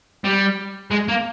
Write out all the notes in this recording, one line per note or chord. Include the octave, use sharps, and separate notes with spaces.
G3
G#3
A#3